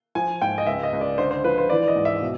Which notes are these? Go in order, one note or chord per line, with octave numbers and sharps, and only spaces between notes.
F3 G#5
G#2 G5
D#5
C#2 E5
D#5
C#2
D5
D3 C5
C5
F3 B4
C5
E3 D5
D#5
G#2
E5
B2